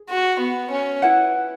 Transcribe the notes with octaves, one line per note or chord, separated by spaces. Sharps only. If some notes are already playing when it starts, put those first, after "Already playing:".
Already playing: G#4
F#4
B3
C#4
E4 B4 F#5